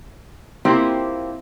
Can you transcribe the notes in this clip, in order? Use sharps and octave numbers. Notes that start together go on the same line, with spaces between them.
A#3 C4 E4 F4 G4 C5